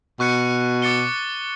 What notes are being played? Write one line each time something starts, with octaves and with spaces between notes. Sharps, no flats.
B2 C#6 F#6 C#7
D6 A6 C#7 G7